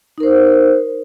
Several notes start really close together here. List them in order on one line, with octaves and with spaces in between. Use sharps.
D#4 A#4 C5